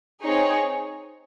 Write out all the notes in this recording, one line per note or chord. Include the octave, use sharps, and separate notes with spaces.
C4 D#4 G#4 C#5